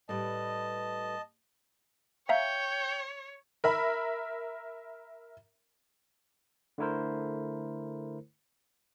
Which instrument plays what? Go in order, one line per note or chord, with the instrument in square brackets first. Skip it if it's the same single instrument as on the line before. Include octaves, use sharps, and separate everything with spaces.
[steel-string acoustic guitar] A2 G3 B4 [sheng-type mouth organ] D#5 A5
[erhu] C#5 [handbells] E5 F5 A#5 [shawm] G5
[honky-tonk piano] A#4 E5 B5
[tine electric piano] D3 A3 E4 A#4 C5